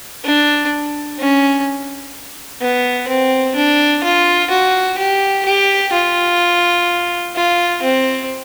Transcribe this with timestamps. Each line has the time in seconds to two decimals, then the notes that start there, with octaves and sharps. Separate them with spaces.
0.25 D4
1.19 C#4
2.61 B3
3.08 C4
3.56 D4
4.03 F4
4.50 F#4
4.98 G4
5.45 G4
5.92 F4
7.35 F4
7.83 C4